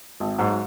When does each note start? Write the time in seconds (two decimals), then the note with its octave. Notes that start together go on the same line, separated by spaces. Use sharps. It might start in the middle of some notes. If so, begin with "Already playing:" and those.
0.20 G#1
0.38 G#2 F#3